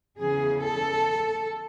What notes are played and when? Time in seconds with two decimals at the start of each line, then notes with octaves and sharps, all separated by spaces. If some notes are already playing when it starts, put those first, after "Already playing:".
0.20 E2 C#3 E3 G#4
0.61 A4